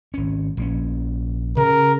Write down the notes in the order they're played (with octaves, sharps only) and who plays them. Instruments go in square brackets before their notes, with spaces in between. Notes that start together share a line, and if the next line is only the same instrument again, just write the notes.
[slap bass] G#1 C#4
A#1 A#3 C#4
[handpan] C#3 [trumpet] A#4